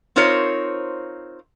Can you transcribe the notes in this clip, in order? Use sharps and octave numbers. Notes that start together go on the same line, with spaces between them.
C4 D#4 F4 A#4 C5 C#5